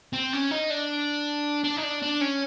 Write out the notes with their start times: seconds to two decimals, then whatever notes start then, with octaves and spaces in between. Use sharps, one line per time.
0.13 C4
0.33 C#4
0.51 D#4
0.70 D4
1.64 D4
1.77 D#4
1.83 D4
2.02 D4
2.21 C#4